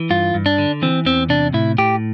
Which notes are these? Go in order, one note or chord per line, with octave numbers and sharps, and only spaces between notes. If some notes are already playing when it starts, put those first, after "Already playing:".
Already playing: E3
G2 F4
G2
D4
D3
E3 C4
E2 C4
C3 D4
A2 E4
A2 G4